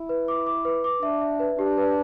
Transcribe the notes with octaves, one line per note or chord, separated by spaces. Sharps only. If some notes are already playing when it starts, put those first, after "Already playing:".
Already playing: E4
B4
D6
D6
B4
D6
D4 E5
E5
B4
D4 G4
B4